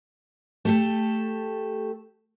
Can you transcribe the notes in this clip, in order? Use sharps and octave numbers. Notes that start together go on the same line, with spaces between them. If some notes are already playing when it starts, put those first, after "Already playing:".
A3 G4 A4